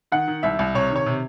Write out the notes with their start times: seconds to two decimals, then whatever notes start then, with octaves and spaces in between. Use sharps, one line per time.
0.12 D#3 F#5
0.28 D#3
0.43 C2 E5
0.59 C2
0.74 C3 C#5
0.90 D#3
0.96 C#5
1.06 C3